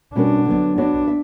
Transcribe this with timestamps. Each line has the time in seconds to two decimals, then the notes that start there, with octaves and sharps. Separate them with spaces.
0.15 B2 G3 C#4 D4 F#4 A#4
0.45 D3 F#3 B3
0.78 B3 D4 F#4 C#5 E5
1.08 E5